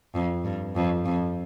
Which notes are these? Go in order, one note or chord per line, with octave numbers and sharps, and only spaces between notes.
F2
G2
F2
F2